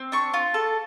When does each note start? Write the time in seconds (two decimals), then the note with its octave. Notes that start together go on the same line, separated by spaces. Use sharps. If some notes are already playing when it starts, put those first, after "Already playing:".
Already playing: C4
0.12 D4 C#6
0.34 F4
0.54 A4